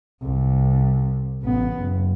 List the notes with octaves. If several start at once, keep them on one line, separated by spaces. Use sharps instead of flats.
C2
A1 B3
F#1